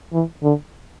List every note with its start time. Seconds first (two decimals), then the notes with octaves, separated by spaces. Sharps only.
0.13 E3
0.43 D3